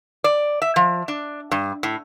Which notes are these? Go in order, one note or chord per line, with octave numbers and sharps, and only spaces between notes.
D5
E5
F3
D4
G2
A2